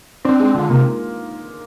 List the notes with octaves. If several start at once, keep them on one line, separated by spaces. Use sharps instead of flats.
C4 D4
G#3 C4
D3 F4
C3 A#3